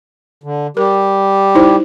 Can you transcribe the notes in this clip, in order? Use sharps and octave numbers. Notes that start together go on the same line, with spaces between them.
D3
G3 G4 A#4
D#4 E4 C5